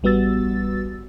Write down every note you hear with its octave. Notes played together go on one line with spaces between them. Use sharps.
A1 G3 B3 F#4 E6 A6